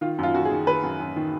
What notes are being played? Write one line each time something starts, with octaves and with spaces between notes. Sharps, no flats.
D#3 F4
F#2 F4
F#2 F#4
G#4
D#3
D#3 B4
F#2
F#2
D#3